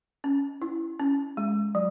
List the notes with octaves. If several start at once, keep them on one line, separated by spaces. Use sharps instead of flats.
C#4
E4
C#4
G#3
F#3